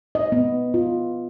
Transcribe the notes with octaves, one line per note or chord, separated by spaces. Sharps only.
D#5
B3
F4